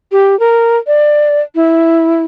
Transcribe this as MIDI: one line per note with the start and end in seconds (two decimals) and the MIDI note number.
0.12 0.38 67
0.40 0.77 70
0.87 1.41 74
1.55 2.24 64